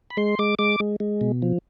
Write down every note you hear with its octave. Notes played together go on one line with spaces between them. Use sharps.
B5
G#3 C6
G#3 D6
G#3 D6
G#3
G#3
B2
F3